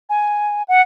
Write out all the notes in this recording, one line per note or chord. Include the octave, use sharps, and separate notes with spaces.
G#5
F#5